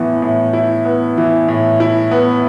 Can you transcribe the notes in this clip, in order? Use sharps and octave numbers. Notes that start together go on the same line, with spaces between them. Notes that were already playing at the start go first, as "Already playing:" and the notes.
Already playing: A2 E3 B3
A2
E4
B3
E3
A2
E4
B3